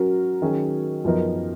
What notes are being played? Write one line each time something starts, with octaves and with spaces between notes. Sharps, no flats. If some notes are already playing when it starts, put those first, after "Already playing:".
Already playing: F#3 C#4 F#4 A#4
D#3 F#3 C#4 G#4
F#2 F3 B3 D#4 A#4